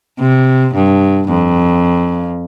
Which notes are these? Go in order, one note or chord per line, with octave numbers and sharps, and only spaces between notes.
C3
G2
F2